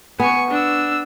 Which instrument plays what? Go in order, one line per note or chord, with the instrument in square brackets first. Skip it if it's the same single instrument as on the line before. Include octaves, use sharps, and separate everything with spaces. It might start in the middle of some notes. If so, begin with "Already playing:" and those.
[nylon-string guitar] B3 [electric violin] G#5 C#6
[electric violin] D4 E6